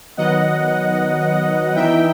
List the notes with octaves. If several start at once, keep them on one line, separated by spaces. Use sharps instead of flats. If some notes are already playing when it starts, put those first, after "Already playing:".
D#3 F#3 B3 D#5 F#5
E3 B3 D#4 E5 G5